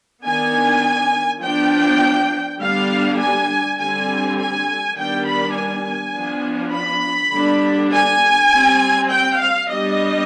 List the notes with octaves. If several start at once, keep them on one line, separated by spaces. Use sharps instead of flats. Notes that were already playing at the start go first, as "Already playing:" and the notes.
D#3 B3 D4 G#5
F3 B3 D4 G5
D3 G3 B3 D4 F5
G#5
D3 G3 C4 G#5
G#5
D#3 G3 B3 D4 G5
B5
G#5
F3 B3 D4
B5
D3 G3 B3 D4
G#5
G3 C4
G5
F5
G3 B3 D4 D#5